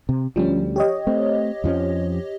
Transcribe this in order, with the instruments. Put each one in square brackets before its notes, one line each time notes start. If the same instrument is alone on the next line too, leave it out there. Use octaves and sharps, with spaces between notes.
[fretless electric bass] C3
[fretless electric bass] D2 G3 [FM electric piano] F3 C#4
[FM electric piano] G4 C#5 D#5
[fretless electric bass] A3 C4
F2 F3 C#4